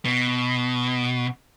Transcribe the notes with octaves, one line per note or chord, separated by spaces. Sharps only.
B2